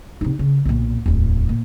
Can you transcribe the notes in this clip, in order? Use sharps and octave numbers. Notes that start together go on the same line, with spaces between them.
C3 D#4
C#3
B1 A#2
D1 E2
A#2